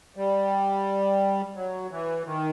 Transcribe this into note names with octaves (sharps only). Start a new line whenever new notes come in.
G3
F#3
E3
D#3